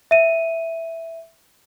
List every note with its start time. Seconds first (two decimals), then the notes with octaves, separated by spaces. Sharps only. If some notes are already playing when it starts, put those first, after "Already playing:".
0.11 E5 D#7